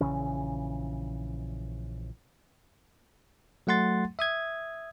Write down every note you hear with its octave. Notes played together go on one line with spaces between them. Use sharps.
A#1 C#3 E3 C#4
F#3 A3 F#5 C6 A6
E5 D#6 G#6